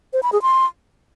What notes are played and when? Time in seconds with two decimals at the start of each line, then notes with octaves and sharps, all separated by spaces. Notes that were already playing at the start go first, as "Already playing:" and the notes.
0.13 C5
0.23 B5
0.33 G#4
0.42 C6